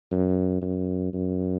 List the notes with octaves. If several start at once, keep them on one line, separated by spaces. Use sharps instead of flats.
F#2
F#2
F#2